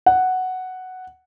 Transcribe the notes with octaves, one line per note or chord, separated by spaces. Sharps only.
F#5